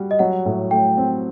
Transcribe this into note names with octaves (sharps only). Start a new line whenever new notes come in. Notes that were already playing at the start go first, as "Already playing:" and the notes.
Already playing: G3 F#4
D#5
F#3 F#5
A2
A3 G5
C4